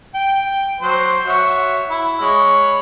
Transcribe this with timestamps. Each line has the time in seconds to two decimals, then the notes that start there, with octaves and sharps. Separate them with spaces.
0.14 G5
0.81 F#3 C5
1.26 F#4 C#5 E5
1.89 E4
2.21 G#3 C#5 B5